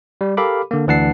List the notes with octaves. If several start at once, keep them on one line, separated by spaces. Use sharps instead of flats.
G3
G4 A4 A#4 F5 B5 D6
D3 A#3
D2 E3 D4 F#5 A5 C7